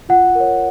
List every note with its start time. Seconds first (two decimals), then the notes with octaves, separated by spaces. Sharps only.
0.09 F4 F#5
0.35 A#4 C#5